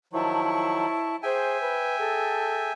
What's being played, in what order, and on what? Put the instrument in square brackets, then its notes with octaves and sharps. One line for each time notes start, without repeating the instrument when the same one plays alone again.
[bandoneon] D#3 F3 F#3 [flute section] E4 A5 C#6
[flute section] G#4 C5 [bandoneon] E5 G5 G#5
[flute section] B4
G#4 A4